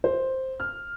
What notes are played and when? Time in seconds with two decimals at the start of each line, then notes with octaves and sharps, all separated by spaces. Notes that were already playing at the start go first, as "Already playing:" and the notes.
0.04 C5
0.60 F6